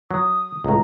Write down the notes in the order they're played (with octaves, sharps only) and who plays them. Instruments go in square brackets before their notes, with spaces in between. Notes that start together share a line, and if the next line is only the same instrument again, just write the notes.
[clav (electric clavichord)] F#3 [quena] D#6
[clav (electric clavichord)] C#2 A2 [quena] A#5